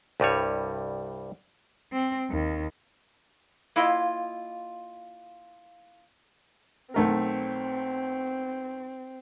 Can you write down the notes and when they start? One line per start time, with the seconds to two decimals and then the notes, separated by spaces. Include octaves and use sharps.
0.20 C2 G2 G3 C#5
1.92 C4
2.30 D#2
3.76 A#3 E4 F4 D#5 F5
6.94 B1 A3 C4 A#4